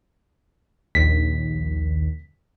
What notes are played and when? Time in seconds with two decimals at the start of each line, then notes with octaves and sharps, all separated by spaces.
0.95 A#1 D#2 B6